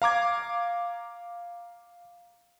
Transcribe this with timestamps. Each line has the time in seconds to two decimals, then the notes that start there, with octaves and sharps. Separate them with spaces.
0.02 F5 A#5 D6 G#6